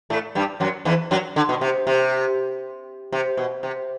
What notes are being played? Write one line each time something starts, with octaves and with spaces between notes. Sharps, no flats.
A2 A3
G2 G3
F#2 F#3
E2 E3
F#2 F#3
D3
B2
C3
C3
C3
B2
C3